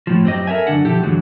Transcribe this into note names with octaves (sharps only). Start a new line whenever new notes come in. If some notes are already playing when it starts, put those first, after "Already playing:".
A2 F3
F#2 C4 G4 D#5
A4 A#4 D#5 E5 G#5
F#2 D3 D4 F#5
B2 F3 E4 G4 A4
F#2 D3 E3 F#3 G#3